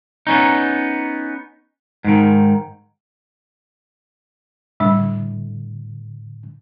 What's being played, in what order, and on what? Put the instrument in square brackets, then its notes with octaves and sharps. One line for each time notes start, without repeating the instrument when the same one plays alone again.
[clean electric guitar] B3 C#4 D#4
G#2 D#3
[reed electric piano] A2 D3 [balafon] G3 D4